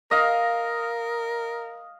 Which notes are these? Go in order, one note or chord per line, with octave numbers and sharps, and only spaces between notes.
A#4 D#5 F5